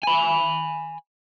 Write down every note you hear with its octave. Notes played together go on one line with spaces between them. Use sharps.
G#5 B5